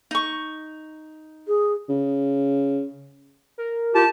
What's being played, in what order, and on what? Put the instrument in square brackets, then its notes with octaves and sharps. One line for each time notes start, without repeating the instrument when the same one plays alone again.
[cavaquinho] D#4 C#6
[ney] G#4
[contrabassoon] C#3
[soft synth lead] A#4
[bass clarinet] F4 [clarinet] G4 [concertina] A5